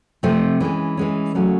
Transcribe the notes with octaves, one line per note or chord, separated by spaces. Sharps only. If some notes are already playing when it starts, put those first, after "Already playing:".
C3 F3 A3 C4
E3 G#3 C#4
E3 G#3 C#4
C#3 F#3 A3